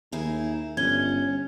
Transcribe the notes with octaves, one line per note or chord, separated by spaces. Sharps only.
D#2 D#4 E4 G#4
G1 C#4 G#6 G7